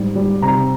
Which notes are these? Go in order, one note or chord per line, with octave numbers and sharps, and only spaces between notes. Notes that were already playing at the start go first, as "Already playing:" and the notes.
Already playing: G#2 G3
G3
C3 A#5